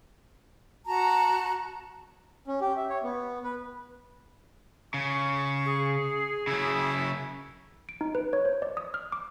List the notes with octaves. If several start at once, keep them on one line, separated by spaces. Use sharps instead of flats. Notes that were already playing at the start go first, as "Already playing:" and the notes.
F#4 A5 A#5
C#4
G4
E5
C#5
B3
B4
C#3 C#6
G#4
C#3 F#3 E4
D7
D#4
B4
C#5
C5
D5
D#6
F6
D6